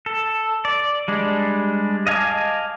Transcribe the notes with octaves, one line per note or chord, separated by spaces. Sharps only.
A4
D5
G3 G#3 D4
D#5 F5 G#5 A5 D6